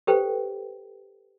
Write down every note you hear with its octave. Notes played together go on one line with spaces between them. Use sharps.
G4 A4 B4 C5 G5